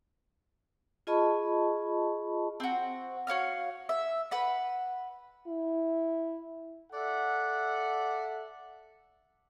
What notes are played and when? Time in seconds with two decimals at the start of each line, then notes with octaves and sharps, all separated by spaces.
1.07 F4 G#4 D#5 A5 B5 C#6
2.60 C4 F#4
3.27 F#4 C#5 F5 F6
3.89 E5
4.31 B4 F#5 B5
5.48 E4
6.93 A4 D5 E5 F#5